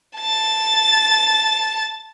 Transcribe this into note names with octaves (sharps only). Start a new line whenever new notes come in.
A5 A6